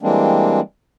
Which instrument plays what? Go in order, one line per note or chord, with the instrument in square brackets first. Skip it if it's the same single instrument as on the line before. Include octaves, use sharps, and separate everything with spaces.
[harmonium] E3 G3 G#3 A#3 C4 D4